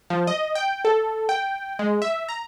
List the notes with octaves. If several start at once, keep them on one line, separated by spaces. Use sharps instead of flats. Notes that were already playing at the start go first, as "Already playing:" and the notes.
F3
D#5
G5
A4
G5
G#3
E5
A#5